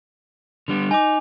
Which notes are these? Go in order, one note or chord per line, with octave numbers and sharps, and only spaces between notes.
D3 G3 B3
D#4 G#5 D6